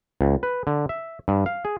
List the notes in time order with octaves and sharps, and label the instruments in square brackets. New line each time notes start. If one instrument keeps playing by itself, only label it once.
[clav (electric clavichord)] C#2
B4
D3
E5
G2
F5
G#4